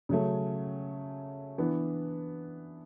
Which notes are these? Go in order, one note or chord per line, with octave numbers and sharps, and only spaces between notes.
C#3 F#3 A3 C#4
E3 B3 D4